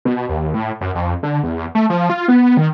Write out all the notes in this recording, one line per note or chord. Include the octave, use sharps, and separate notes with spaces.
B2
D#2
A2
F#2
F2
D3
E2
A3
F3
F4
B3
D#3